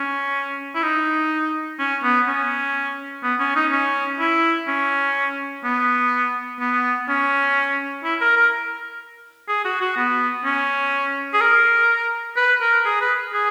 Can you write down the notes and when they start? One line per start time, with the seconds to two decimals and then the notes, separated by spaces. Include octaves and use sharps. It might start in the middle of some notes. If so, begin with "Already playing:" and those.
Already playing: C#4
0.75 E4
0.83 D#4
1.79 C#4
2.03 B3
2.28 C#4
3.23 B3
3.40 C#4
3.55 D#4
3.72 C#4
4.20 E4
4.68 C#4
5.64 B3
6.60 B3
7.08 C#4
8.04 E4
8.21 A#4
8.37 A#4
9.49 G#4
9.65 F#4
9.81 F#4
9.97 B3
10.45 C#4
11.34 G#4
11.41 A#4
12.37 B4
12.61 A#4
12.85 G#4
13.01 B4
13.33 G#4